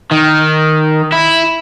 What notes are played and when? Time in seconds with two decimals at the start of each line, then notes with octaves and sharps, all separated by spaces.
0.12 D#3
1.12 E4